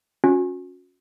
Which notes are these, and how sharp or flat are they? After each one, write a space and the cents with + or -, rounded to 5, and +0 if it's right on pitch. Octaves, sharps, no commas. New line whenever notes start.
C#4 +0 F#4 -35